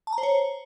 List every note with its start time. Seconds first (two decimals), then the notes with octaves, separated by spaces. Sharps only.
0.07 A5
0.13 A#5
0.18 C5
0.23 C#5